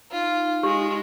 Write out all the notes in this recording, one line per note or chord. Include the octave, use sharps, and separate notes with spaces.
D#4 F4
G#3 G4